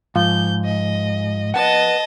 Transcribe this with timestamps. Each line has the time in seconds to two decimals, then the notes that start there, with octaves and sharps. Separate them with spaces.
0.16 G#2 F3 G6
0.65 D#5
1.54 B4 D#5 F#5 A5